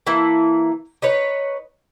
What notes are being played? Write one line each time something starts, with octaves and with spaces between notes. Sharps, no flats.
E3 A#3 E4 A5
D#4 B4 C#5